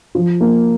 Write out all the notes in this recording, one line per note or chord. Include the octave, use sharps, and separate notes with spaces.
F3
A#3